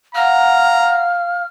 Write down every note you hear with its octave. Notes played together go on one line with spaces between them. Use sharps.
F5 F#5 A#5 F6